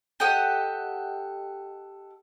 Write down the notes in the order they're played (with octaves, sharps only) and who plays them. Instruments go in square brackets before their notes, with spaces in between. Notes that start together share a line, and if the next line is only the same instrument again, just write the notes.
[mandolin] G4 A4 D#5 F#5